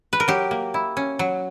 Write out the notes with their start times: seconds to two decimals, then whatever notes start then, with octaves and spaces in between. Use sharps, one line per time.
0.13 B4
0.20 A#4
0.28 F#3 G4
0.51 A#3
0.74 E4
0.97 C#4
1.19 F#3